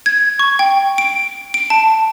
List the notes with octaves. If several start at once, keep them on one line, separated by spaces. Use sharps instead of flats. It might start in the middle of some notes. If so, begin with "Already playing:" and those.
G#6
C#6
G5
D7
D7
A5